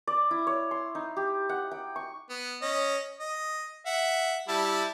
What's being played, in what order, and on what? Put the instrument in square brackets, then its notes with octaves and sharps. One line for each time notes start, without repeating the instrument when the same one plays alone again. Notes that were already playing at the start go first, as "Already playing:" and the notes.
[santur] D5
E4
C#5
C6
D#4
G4
F#5
G5
C#6
[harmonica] B3
C#4 D#5
D#5
E5 F#5
G3 E4 A5